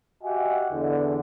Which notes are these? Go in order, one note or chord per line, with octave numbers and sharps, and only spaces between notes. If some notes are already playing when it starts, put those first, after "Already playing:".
F#4 G4 D#5 E5 F#5 G#5
E2 D3